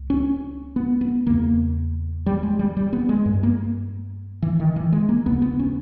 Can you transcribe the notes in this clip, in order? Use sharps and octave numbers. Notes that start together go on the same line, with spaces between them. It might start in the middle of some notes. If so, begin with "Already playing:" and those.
Already playing: C#2
C#4
B3
B3
E2 C#3 A#3
G3
G#3
G3
G3
B3
G#3
G2
A#3
E3
D#3
E3
G#3
A#3
D#2 C#3 B3
B3
C#4